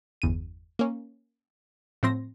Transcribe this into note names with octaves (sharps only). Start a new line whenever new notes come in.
G1 E2 D#7
A#3 C#4
A2 F3 C4 C6 A#6